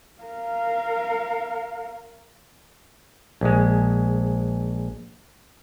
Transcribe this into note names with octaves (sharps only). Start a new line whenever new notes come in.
A#4 F5
A#1 G#3